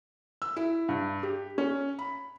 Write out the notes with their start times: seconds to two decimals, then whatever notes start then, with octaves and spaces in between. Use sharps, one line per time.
0.42 E6
0.56 E4
0.88 G2
1.23 G4
1.58 C#4
1.99 B5